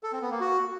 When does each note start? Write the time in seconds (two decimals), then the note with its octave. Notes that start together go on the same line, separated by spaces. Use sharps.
0.03 A4
0.13 C4
0.22 B3
0.31 A#3
0.40 F#4